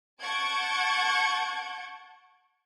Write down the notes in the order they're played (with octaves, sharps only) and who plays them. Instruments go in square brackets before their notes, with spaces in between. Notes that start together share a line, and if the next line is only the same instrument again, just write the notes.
[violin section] F#5 A5 C#6 G6 G#6 D7